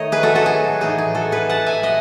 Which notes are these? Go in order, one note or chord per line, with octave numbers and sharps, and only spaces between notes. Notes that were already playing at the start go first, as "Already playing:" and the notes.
Already playing: D#3 A3 D#4 C#5 D#5
G#4 B4
F#4 A4
F#4 A4
G#4
A2 E3 A3 D#4 G#4
G#4
F#4 A4
G#4 B4
F#5 A5
E5 G#5
D#5 F#5